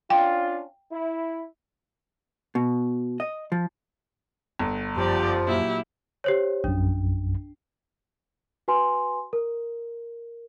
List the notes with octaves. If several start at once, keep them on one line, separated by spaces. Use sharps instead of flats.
C#4 D4 F4 G5
E4
B2
D#5
F3
G1
F#2 F3 G4 D5
A#2 F#3 E4 G4
G4 C5 C#5
A#1 F#2 D4
F#4 B4 G#5 C6
A#4